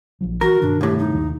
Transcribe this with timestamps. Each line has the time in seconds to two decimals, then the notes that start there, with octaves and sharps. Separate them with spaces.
0.21 A#1 F3 F#3
0.41 E3 F#4 A#4
0.62 G2 B2 D#3 D4
0.81 C2 A2 G4
0.99 D#4
1.14 D#2 C3 D#3